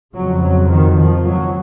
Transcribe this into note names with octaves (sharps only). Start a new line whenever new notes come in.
F2 C#3 F#3
F#3
D#3
F3
F#3